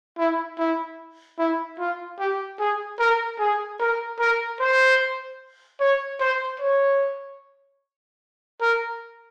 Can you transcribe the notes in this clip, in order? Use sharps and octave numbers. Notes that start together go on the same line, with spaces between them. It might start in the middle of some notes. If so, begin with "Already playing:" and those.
E4
E4
E4
F4
G4
G#4
A#4
G#4
A#4
A#4
C5
C#5
C5
C#5
A#4